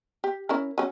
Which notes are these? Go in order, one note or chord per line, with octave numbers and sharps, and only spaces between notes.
G4
C#4 E4 A#4
F#3 C#4